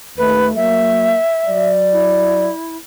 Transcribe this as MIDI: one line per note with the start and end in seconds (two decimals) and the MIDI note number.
0.17 0.51 39
0.17 0.51 57
0.17 0.45 71
0.56 1.15 54
0.56 1.15 58
0.56 1.70 76
1.46 2.50 54
1.46 2.50 74
1.92 2.76 64